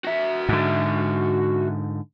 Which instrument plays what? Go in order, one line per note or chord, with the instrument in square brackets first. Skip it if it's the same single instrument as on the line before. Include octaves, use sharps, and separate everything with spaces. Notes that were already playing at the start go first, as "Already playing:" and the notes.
[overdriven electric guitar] F#4 E5
[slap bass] G#2 D3